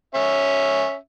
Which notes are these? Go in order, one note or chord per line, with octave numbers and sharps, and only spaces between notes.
C#4 E5